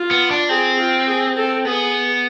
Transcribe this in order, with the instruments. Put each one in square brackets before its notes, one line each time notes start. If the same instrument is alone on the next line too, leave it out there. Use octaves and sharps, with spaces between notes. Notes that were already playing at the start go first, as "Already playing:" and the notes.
Already playing: [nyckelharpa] F4
[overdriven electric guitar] B3
D4
[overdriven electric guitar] C4 [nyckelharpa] G#4
[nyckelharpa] F4
G#4
A4
[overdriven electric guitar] B3 [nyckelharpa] G#4